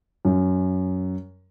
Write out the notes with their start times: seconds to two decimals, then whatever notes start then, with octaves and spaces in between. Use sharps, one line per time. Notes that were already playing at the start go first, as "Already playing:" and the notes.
0.25 F#2